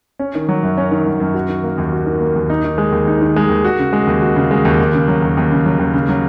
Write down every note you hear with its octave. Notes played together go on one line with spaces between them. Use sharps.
C#4
D#3
F#3
F#2
C#4
D#3
F#3
F#2
F#4
D#3
A#3
D#2
F#4
D#3
A#3
D#2
D#4
D#3
G#3
D#2
D#4
D#3
G#3
D#2
F#4
C#3
G#3
D#2
F#4
C#3
G#3
D#2
D#2
C#3
F#3
D#2
D#2
C#3
F#3
D#2
C#3
F#3